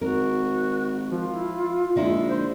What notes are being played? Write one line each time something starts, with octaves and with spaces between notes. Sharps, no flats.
G#1 F#4 A#4
F3 F4
E4
A#1 D3 G#3 D#4 E4
C5